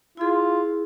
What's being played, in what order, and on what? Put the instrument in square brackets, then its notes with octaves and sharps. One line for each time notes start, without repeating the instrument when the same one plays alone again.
[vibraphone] E4 G#4 [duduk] F4